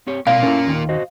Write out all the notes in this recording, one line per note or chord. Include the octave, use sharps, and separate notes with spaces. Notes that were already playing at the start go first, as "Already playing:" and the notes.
C4 G4 C#5
B2 A#3 C4 F4 D5 F5
C#4 E4 A4 A#4
D#2 D#3
F#4 C5 D#5